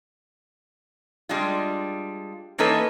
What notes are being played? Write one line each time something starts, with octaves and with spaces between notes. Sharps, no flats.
G3 G#3 D4 F4
E3 A#3 D#4 A4 B4 C#5